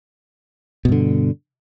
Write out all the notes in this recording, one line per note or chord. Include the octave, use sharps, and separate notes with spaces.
G2 B2 D3